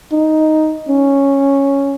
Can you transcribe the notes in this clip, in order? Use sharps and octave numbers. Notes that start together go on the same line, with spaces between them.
D#4
C#4